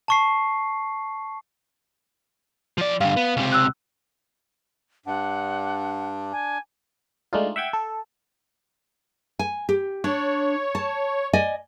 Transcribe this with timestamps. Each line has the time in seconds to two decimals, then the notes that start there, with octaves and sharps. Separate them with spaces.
0.08 A5 C#6 C7
2.78 F3 D5
3.01 G2 D3 F5
3.17 B3
3.37 C#2 C3
3.52 E6 F#6
5.06 G2 D4 F#5
6.32 G#5
7.33 G#3 A3 D4 D#4 F4
7.56 E5 F#5 G5 G#6
7.73 A4
9.39 G#5
9.69 G4
10.04 D4 C#5
10.75 A5
11.33 D5 D#5 G#5